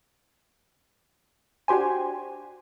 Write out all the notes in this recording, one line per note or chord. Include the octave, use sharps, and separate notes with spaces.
D4 F#4 G4 C5 G#5